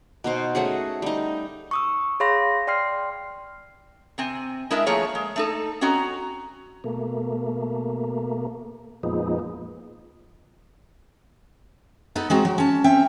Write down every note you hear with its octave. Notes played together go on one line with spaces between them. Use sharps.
B2 D#4 C5
A3 C#4 F#4 G#4
G3 D#4
C#6 D#6 E6
G#4 C#5 F5 B5 C6 A#6
D5 G5 C6 F6 C7
C3 C4 G#5
G#3 D4 E4 A#4 D#5 E5
F3 A3 A#3 G#4 C#5
G#3
A3 D#4 A4
C4 C#4 F#4 D#5 A#5
B2 A3 A#3
F2 A#2 F3 G#3 B3 D#4
B3 D#4 A4 B4
G#3 C4 F#4 A#5
F#3
C#4 A5
C4 C#4 E5 G5